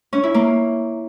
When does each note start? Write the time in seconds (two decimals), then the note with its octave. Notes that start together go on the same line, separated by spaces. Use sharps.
0.13 C#4
0.23 E4
0.34 A#3